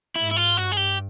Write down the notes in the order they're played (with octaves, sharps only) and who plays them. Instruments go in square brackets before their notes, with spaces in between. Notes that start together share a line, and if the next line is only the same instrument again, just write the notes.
[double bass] G#2 [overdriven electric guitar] E4
[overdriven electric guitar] E4
F4
[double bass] G2 [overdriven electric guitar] F#4
[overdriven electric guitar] G#4
G4